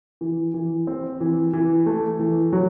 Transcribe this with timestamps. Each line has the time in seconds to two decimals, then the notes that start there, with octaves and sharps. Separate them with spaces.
0.21 E3
0.54 E3
0.87 C4
1.21 E3
1.53 E3
1.86 A3
2.19 E3
2.53 F#3